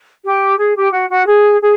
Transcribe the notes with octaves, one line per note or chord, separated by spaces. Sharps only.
G4
G#4
G4
F#4
F#4
G#4
G#4